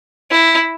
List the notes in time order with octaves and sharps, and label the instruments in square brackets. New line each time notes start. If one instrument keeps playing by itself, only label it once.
[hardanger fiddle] E4